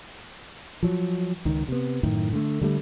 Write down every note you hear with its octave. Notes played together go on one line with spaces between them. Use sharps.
F3 F#3
C#2 D#3
C3 B3
F#2 A2 D#3
D3 A3
D3 G3 A3